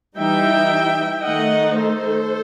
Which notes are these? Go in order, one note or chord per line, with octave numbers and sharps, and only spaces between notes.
E3 G3 D#4 E5 G5
D#3 A3 D#4 D#5 F#5
A4 C5